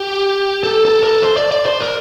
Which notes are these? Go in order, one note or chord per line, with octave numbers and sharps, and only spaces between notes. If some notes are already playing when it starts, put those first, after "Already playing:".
Already playing: G4
A4
A4
A#4
A4
C5
D5
D5
C5
A#4